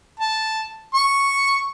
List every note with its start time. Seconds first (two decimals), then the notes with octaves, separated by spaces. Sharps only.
0.20 A5
0.94 C#6